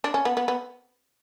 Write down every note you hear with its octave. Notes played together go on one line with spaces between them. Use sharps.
D4
C#4
B3
B3
B3